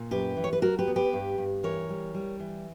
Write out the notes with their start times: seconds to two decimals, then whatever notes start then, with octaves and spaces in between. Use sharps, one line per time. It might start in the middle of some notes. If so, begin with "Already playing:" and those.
Already playing: A#2
0.11 F#2 G4 B4
0.37 E3
0.44 C#5
0.53 B4
0.62 F#3 F#4 A#4
0.79 G4 B4
0.87 B3
0.96 G4 B4
1.13 G2
1.38 G2
1.63 E3 A#4 C#5
1.89 G3
2.14 G3
2.40 E3